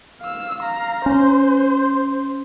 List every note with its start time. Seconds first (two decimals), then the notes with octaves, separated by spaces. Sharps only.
0.21 F5 E6
0.61 F5 A#5
1.06 C#4 C5